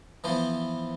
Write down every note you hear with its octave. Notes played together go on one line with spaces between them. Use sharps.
E3 F3 B3 C5